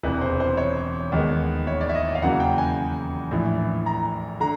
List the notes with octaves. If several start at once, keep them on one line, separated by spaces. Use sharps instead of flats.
E1 E2 C3 B4
C5
C5
C#5
D#2 D#3 G#3 B3
C#5
D5
E5
D#5
D#5
F5
E2 C#3 F#3 A#3 F#5
G5
G#5
A#1 A2 E3
A#5
D3 A#5